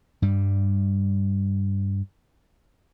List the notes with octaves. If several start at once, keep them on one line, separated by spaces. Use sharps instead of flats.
G2 G3